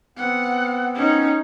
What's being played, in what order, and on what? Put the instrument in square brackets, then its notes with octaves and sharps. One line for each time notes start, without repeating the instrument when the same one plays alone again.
[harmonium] B3 C4 [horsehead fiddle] F#5
[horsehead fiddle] C#4 D#4